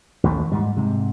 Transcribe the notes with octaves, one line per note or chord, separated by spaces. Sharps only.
A1 D#2 E3 A3
G#2 G3
G#2 C3